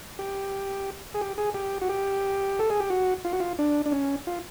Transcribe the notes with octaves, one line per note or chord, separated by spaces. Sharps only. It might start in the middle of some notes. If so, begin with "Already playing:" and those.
G4
G#4
G4
G#4
G4
F#4
G4
A4
G#4
G4
F#4
F4
F#4
F4
D4
D4
C#4
F4